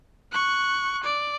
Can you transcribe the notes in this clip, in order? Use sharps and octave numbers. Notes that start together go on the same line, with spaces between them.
C#6 F#6
D5